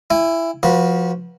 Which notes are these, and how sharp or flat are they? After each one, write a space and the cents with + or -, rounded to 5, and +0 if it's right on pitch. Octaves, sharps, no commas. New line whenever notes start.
E4 +15 G#5 -35
F3 +10 F#4 +0 B4 -25